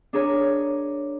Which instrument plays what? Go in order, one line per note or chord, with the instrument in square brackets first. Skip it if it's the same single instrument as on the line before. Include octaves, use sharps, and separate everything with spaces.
[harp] D4 G#4 A#4 C#5